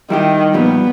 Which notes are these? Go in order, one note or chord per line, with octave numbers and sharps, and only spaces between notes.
D#3 G3 E4 G4
A#2 F3 G3 B3